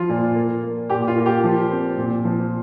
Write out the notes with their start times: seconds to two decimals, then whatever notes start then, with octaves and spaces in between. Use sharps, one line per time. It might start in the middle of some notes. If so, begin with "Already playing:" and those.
Already playing: F3 F4
0.09 A#2
0.35 A#3
0.63 A#3
0.90 A#2 G4
1.07 F4
1.17 A#3
1.26 G4
1.44 F3
1.71 C4
1.98 A#2
2.24 F3